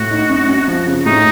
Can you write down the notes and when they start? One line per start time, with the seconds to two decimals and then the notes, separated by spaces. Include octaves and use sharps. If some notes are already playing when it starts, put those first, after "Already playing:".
Already playing: A2 F#4
0.10 D#4
0.29 F#2
0.49 F#2
0.68 F3
0.87 C#3
1.06 A2 D#4